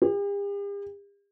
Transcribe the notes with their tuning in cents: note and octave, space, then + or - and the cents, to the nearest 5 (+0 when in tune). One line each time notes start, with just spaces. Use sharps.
G4 +45